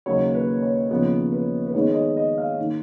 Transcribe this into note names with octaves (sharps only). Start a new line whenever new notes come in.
D#2 C#3 F#3 A#3 C#5
B4
C#5
D#2 C#3 F3 B3 C#5
B4
B4
G#2 D#3 G#3 B3 C#5
D#5
C#5
D#5
F5
D#3 A#3